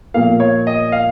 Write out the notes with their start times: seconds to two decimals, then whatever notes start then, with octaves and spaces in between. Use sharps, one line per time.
0.14 A#2 F3 A#3 F5
0.40 C#5
0.67 D#5
0.92 F5